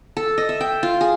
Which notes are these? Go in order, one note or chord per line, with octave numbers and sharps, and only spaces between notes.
A4
D#5
E5
G5
F4
G#4